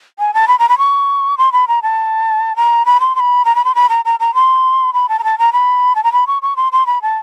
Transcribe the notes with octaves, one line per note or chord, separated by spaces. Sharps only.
G#5
A5
B5
A#5
B5
C#6
C6
B5
A#5
A5
A#5
B5
C6
C6
B5
A#5
B5
C6
B5
A#5
A#5
A#5
C6
B5
A5
A#5
A5
A#5
B5
A5
A#5
B5
C#6
C#6
C6
C6
B5
A5